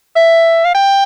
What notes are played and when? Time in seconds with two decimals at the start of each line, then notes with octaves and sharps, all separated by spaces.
0.16 E5
0.65 F5
0.75 G5